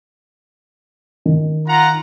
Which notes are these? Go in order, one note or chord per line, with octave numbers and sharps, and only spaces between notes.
D#3
F4 F#5 A#5